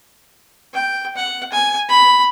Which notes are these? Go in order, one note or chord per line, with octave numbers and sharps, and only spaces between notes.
G5
F#5
G#5
B5